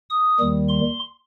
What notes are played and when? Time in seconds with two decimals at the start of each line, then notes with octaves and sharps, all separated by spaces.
0.10 D#6
0.39 D#2 D#3 G3
0.69 C6